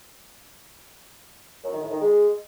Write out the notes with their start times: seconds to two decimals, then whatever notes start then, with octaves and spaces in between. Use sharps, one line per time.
1.63 F#2
1.72 D#3
1.81 A2
1.91 D#3
2.00 G#3